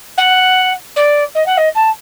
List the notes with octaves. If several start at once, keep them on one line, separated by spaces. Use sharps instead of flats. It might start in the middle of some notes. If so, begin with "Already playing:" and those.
F#5
D5
D#5
F#5
D#5
A5